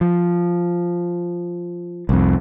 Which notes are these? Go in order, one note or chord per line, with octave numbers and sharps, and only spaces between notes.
F3
C2 F2